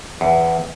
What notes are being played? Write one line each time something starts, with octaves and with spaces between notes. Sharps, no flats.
E2